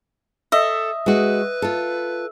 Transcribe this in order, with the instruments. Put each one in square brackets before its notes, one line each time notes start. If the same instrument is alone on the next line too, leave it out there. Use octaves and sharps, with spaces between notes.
[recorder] A4 [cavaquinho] D#5 [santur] E5
[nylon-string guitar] G#3 F#4 [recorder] B4
[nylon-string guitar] F4 A4